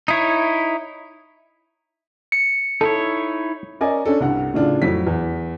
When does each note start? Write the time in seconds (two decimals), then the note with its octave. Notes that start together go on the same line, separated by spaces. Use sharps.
0.08 D#4 E4 C#5
2.32 C#7
2.81 D#4 E4 A4 C#5
3.81 C#4 A#4 D5 D#5 G#5
4.05 C#4 D4 A4
4.20 C2 G2 F#5
4.54 A2 C#3 D4 F4
4.82 F2 A2 F#3 B6
5.07 E2